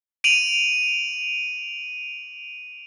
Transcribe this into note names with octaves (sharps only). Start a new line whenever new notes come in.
D7 D#7 F7 F#7